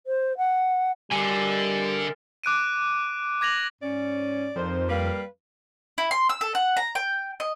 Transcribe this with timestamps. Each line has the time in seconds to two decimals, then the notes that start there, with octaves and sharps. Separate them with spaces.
0.06 C5
0.37 F#5
1.12 D3 G3 A#4 G#5
2.44 D6 F#6 D7 D#7
3.41 D6 G#6 A#6 F7 F#7
3.82 G#2 C#4 D5
4.56 F2 D#4 A#4 C5
4.89 G3 A#3 B4 F5
5.98 E4
6.11 C6
6.29 E6
6.41 A4
6.55 F#5
6.77 A#5
6.95 G5
7.40 D#5